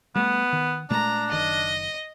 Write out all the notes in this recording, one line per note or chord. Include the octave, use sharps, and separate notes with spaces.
G3 A3 B3
D#3
A#2 G#3 A3 D4 A#5
F#1 D#3 D#5